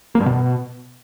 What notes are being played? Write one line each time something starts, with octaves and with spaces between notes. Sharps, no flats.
A#3
G2
B2